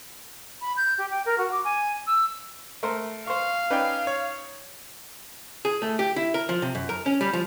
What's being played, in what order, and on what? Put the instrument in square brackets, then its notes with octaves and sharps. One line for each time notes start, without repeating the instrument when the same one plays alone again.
[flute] B5
G6
G4
G5
A#4
F#4
D6
G#5
E6
[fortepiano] A3 A#4 C5
[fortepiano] C5 C#6 [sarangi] F5
[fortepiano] C#4 D#4 D5 [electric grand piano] B4 G5
[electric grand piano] C#5
[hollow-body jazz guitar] G#4
A3
G4
E4
A#4
F3
C3
F#2
A#4
C#4
G3
F3